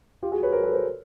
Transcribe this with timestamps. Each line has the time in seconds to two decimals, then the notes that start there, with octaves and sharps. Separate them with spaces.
0.22 F4 G4
0.32 F#4 G#4
0.43 B4 C#5
0.52 A#4 C5
0.63 A4 B4
0.73 A#4 C5